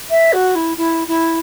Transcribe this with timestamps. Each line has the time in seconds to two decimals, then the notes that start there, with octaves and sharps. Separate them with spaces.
0.10 E5
0.32 F#4
0.55 E4
0.77 E4
1.07 E4